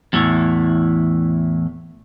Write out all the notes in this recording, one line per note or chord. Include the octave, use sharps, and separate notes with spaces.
E2 A2 E3